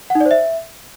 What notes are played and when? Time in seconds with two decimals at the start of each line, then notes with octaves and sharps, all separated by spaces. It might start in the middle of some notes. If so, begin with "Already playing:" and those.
0.10 F#5
0.15 D#4
0.20 D5
0.26 C5
0.31 E5